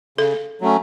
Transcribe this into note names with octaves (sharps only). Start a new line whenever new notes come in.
C#3 A4
F#3 A3 C#4